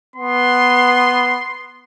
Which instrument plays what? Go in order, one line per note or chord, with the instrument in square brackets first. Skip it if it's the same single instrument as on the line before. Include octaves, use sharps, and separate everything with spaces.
[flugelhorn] B3 [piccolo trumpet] C6